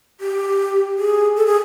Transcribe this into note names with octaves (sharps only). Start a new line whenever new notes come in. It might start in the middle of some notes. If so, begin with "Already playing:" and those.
G4
G#4
A4
G#4